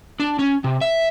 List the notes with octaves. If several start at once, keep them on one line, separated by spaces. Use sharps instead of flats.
D4
C#4
C3
E5